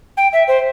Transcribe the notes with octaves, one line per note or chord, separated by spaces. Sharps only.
G5
E5
C5